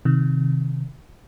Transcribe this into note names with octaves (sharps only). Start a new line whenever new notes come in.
C3 D#3